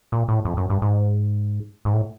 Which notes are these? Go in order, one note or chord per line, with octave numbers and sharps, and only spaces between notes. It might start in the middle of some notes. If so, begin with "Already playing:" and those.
A#2
A2
F2
F#2
G2
G#2
G#2
A2